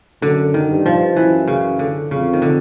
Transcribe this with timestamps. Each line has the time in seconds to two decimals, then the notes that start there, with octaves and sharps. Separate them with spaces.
0.22 F#2 D3
0.54 D#3
0.70 G2
0.86 F3
1.16 F#2 E3
1.47 C#3
1.79 D3
2.11 F2 C#3
2.33 D#3
2.42 D3